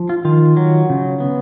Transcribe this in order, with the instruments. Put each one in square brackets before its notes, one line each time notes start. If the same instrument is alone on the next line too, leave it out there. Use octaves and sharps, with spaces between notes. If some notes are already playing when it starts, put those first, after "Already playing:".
Already playing: [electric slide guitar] F3
F4
D#3 F4
F#3
C#3
B3